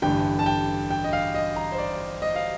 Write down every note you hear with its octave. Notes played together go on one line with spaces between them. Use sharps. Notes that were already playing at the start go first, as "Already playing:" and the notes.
A1 G2 D3 A3 G5
A5
G5
G5
D#5
F5
D#5
A#5
C5
D5
D#5
F5